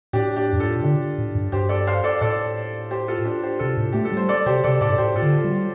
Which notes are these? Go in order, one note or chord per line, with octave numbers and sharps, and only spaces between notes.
A2 D4 G4
D4 G4
F2
G2 F4 A4
A2
C3
D3 D4 G4
A2
G2
G2 G4 C5
A4 D5
C5 F5
A4 D5
A2 A4 D5
G4 C5
F4 A4
D4 G4
G4 C5
C3 F4 A4
A2
A3 G4
A4
G3
C5
A4 D5
C3 G4 C5
C3 A4 D5
A2 A4 D5
G2
A2 G4 C5
F4 A4
D3
F4
G3
F4